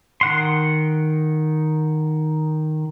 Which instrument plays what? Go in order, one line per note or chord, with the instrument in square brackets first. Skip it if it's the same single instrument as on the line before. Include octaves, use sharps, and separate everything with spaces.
[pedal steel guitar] D#3 F#5 C6